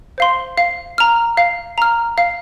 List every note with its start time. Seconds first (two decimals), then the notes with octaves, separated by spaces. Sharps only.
0.18 C5 F5 C6
0.58 F5
0.98 A#5 F6
1.37 F5
1.78 A#5 F6
2.18 F5